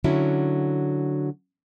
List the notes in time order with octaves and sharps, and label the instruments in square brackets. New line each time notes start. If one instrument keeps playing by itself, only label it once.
[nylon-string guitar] D3 F#3 C#4 E4